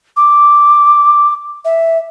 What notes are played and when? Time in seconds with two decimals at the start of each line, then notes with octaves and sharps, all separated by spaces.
0.17 D6
1.65 E5